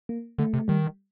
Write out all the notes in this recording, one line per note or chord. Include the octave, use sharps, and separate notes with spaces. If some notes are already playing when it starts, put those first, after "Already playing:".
A#3
D3 A3
C3
D#3 G3